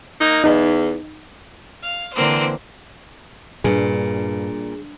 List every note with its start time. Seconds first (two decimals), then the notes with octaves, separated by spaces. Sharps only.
0.20 A#3 D#4
0.44 E2 D#4
1.82 F5
2.13 D3 E3 A#3 C4 C5
3.64 G2 A#2 G#4